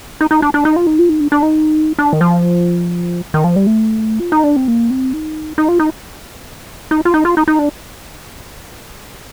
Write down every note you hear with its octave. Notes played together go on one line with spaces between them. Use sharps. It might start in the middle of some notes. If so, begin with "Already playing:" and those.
D#4
D#4
D4
D4
D#4
F4
D#4
F4
D#4
D4
D4
D#4
D4
D#3
F3
D#3
F3
G3
A3
F4
D#4
D4
C4
A#3
C4
D#4
D#4
F4
D#4
D#4
F4
D#4
F4
D#4
D#4
D4